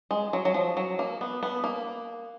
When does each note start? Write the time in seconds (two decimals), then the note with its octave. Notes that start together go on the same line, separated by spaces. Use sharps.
0.11 G#3
0.33 F#3
0.45 F#3
0.54 F3
0.77 F#3
0.99 A#3
1.21 B3
1.43 B3
1.64 A#3